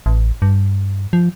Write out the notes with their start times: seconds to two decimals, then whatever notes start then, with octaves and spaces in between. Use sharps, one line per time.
0.06 A1
0.42 G2
1.13 F3